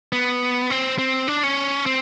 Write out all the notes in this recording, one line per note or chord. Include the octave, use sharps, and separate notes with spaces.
B3
C4
C4
D4
C#4
C4